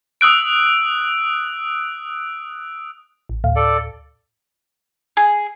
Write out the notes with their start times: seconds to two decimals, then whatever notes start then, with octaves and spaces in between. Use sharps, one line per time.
0.21 D#6 E6 F#6 D7
3.29 A1
3.44 D2 A2 F5
3.56 A4 D5
5.17 G#4